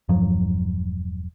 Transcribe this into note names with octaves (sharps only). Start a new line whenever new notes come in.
E1 G2 F3 F#3